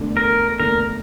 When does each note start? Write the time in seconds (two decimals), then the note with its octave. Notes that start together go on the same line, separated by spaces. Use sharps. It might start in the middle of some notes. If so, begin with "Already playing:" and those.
Already playing: E1 D2 D3 A3 D4
0.17 A#4
0.60 E1 D2 D3 A3 D4 A#4